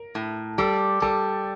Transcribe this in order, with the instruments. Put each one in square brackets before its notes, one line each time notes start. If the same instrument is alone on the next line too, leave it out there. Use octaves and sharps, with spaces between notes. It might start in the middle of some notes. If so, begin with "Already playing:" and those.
Already playing: [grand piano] A#4
[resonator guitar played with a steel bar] A2
[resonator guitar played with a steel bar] G3 [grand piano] A4
[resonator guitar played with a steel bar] G3 [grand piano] A4